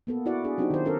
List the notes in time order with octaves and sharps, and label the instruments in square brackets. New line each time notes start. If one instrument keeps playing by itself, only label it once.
[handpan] A#3 B3 A4
E4 F#4 D5 F#5
D4 G#4
F#3 C4 D4 D#4 F4 G4
D#3 C5
C#4 A4 A#4